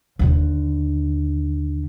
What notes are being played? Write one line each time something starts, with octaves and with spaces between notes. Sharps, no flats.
D#2 D3